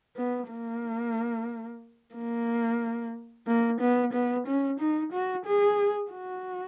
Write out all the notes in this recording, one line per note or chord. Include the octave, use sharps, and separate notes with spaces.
B3
A#3
A#3
A#3
B3
B3
C#4
D#4
F#4
G#4
F#4